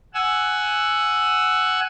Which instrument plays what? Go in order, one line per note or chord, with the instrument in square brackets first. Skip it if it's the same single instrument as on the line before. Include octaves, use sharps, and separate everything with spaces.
[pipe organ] F#5 G#5 E6